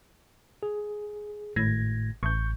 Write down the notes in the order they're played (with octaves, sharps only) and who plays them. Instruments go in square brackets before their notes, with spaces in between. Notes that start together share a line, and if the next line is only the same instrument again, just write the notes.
[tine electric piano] G#4
[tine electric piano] G#1 G#6 A#6 [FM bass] A2
[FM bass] A1 [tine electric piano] C#6 G6